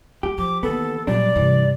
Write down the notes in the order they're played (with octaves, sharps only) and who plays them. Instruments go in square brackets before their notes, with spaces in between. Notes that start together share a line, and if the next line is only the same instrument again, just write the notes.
[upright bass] G#3 [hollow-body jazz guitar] G4
[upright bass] F3 [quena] D6
[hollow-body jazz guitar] D#2 B3 [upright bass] E3 [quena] A4
[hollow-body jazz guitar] F#2 G3 D4 [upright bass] A#2 [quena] D5
[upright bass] G2 C3 [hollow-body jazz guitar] E3